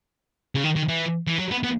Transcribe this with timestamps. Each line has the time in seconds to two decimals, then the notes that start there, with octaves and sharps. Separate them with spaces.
0.55 C#3
0.64 D#3
0.76 D#3
0.88 E3
1.27 E3
1.39 F#3
1.51 B3
1.63 B3